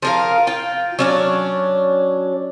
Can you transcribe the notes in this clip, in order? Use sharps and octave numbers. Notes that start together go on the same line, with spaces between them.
F3 A#4 F5
F4 G5
F#3 C#4 D4